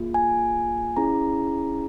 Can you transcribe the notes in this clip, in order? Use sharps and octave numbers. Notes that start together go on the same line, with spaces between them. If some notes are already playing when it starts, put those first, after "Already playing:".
Already playing: A#3 F4 G#4
G#5
C#4 E4 G#4 A#5